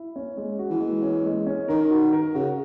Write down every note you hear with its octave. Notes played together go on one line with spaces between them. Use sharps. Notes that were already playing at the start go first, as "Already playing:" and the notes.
Already playing: E4
C#4
G#3
F#4
E3
G#3
C#4
G#3
C#4
D#3 A#4
F#4
A#4
C#3 F#4